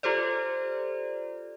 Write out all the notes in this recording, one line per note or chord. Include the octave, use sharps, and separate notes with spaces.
F4 G4 A4 C5 D5